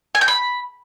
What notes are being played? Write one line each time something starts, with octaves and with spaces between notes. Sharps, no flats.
G#5
G5
B5